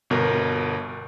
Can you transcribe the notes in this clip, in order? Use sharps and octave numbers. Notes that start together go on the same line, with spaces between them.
G1 B2 A#4